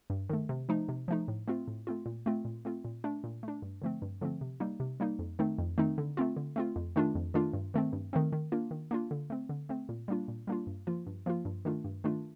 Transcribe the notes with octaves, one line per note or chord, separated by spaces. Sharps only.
G2
D#3 A3
C3
F3 A3 D#4
C3
F3 A3 D#4
A2
A3 C4 F4
A2
A3 C4 F4
A#2
A3 C4 F4
A#2
A3 C4 F4
A#2
A3 D4
A#2
A3 D4
G2
D3 F3 A3 C4
G2
D3 F3 A3 C4
C3
G3 A#3 D#4
C3
G3 A#3 D#4
F2
D#3 A3 C4 D#4
F2
D#3 A3 C4 D#4
D3
A3 C4 F4
D3
A3 C4 F4
F2
D#3 A3 D4 F4
F2
D#3 A3 D4 F4
G2
D#3 A3 C4
G2
D#3 A3 C4
D#3
A#3 D4 F4
D#3
A#3 D4 F4
D3
A3 C4
D3
A3 C4
A#2
G3 A#3 D4 F4
A#2
G3 A#3 D4 F4
G2
F3 A#3 F4
G2
F3 A#3 F4
G2
D#3 A3 D4 F4
G2
D#3 A3 D4 F4